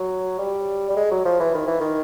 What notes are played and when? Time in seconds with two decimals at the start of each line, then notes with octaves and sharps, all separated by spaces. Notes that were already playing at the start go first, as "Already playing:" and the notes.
Already playing: F#3
0.39 G3
0.90 G3
0.96 G#3
1.11 F#3
1.25 F3
1.40 E3
1.55 D#3
1.67 E3
1.80 D#3